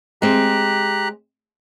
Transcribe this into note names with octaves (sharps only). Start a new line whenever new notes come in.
G#3 C4 G4 A#5 F#6